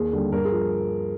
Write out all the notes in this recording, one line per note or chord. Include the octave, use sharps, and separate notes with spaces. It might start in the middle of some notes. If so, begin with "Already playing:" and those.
Already playing: D#2 G#4
D3 G3
G2 A#4
G#4
F3